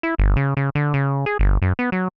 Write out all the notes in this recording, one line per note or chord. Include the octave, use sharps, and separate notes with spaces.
E4
G1
C#3
C#3
D3
C#3
G#4
G1
F#2
B3
F#3